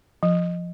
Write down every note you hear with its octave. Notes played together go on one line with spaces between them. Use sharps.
F3